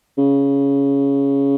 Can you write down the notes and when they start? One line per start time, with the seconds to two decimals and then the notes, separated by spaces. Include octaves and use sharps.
0.18 C#3